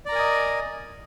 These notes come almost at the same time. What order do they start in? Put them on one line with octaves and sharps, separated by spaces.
D5 A#5 A#4 G#5 D#5